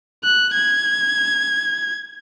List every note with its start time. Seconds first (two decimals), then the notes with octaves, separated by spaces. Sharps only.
0.24 F#6
0.54 G#6